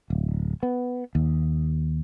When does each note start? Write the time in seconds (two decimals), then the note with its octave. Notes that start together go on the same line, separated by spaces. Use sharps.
0.10 D1
0.63 B3
1.15 D#2